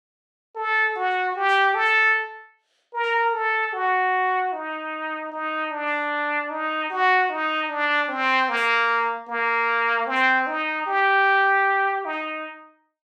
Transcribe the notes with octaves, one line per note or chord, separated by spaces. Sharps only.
A4
F#4
G4
A4
A#4
A4
F#4
D#4
D#4
D4
D#4
F#4
D#4
D4
C4
A#3
A#3
C4
D#4
G4
D#4